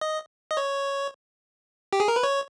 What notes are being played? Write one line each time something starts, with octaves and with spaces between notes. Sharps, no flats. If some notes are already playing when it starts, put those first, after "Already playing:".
D#5
D#5
C#5
G4
G#4
A#4
B4
C#5